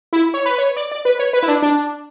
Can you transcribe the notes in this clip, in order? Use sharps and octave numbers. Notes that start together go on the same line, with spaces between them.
E4
C#5
B4
C#5
D5
D5
B4
C#5
B4
E4
D4
D4